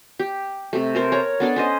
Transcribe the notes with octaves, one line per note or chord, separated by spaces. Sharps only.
G4
C3 A3
A4 A#4 C5
C#5 A#5
B3 D4 A4 D5
C#4 C5 D#5